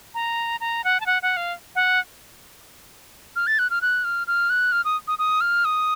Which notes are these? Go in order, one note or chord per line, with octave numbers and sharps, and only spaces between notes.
A#5
A#5
F#5
A5
F#5
F#5
F5
F#5
F6
A6
F#6
F6
F#6
F6
F6
F#6
F6
D#6
D#6
D#6
F6
D#6